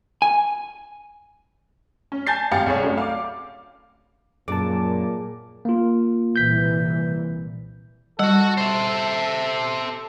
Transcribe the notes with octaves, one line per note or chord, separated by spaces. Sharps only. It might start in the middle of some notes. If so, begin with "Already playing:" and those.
G#5
C#4
G#5 A5 G6 A6 C7
G#1 G4 F5 A6 C#7
C2 G#4 C#5
F#2 A3
F5 D6
F#2 A#2 G#4 A5 D6
A#3 F4
C2 A#2 E3 G6 B6
G3 F#4 A4 F#5
C5 E5